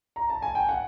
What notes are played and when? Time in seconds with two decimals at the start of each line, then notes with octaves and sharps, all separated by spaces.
0.16 A#5
0.30 A5
0.42 G#5
0.55 G5
0.69 F#5